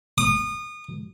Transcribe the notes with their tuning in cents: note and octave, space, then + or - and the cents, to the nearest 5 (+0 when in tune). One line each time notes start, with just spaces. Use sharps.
D#6 -30